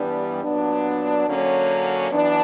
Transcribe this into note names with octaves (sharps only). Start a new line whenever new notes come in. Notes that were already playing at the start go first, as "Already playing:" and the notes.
Already playing: G2 E3 G3 B3 D4
A#2 F#3 B3 D4
D3 F#3 A#3 C#4
F#2 E3 B3 D4